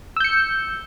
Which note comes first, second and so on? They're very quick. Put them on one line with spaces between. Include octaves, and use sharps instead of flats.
E6 G6 C#7